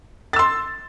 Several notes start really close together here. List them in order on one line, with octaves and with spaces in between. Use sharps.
A6 E6 C6